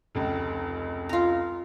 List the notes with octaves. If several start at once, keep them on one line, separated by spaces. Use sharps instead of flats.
F1 C#2
F4 A#5